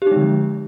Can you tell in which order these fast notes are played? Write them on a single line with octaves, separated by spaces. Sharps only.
G4 D#4 G#3 D3 F3